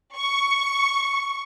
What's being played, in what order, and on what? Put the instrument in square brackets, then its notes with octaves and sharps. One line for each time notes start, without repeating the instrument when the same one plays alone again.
[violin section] C#6